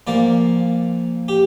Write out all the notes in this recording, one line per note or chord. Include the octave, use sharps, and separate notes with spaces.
A#2 F3 A#3 D5
G4